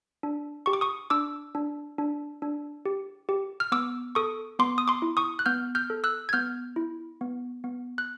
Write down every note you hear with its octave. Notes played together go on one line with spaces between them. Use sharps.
D4
G4 C#6
D6
C#6 D#6
D4 D6 E6
D4
D4
D4
G4
G4
F6
B3 D6 E6
A4 C#6 D#6
B3 C6 D6
D#6
C6 D6
E4
C#6 D#6
F#6
B3 F6 G6
F6 G6
A4
E6 F#6
G#6
B3 F6 G6
E4
B3
B3
F#6